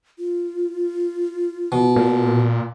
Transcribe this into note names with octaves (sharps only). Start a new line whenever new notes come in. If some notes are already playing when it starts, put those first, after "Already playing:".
F4
B2
A#2